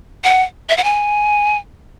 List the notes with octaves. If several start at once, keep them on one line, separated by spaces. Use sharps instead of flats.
F#5
E5
F#5
G#5